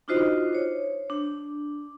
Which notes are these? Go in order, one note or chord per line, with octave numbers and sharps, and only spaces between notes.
D4 D#4 F4 F#4 C5 D#5
C5 C#5
D4